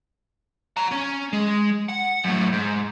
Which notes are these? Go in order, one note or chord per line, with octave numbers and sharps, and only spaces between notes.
F#5 A#5
C#4
G#3
F#5
F#2 A2
G#2